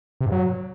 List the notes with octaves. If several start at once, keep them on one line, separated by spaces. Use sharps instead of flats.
C3
G2
F#3